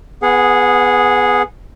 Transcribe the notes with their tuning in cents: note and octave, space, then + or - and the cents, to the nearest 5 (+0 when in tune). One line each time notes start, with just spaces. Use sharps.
B3 +10 G#4 +0 F#5 -30